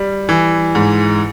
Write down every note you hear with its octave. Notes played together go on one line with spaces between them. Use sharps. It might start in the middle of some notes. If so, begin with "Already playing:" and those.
Already playing: G3
E3
G#2